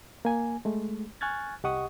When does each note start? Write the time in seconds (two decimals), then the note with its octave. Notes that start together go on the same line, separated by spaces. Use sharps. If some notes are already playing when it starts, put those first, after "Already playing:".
0.25 A#3 G#5
0.65 G#3 A3
1.21 G#5 C#6 F6 F#6 G#6 A6
1.64 C2 G4 D#5 F#5 C#6 D#6